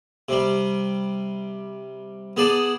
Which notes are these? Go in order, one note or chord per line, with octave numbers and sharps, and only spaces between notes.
C3 G3
B3 G#4 D5 A5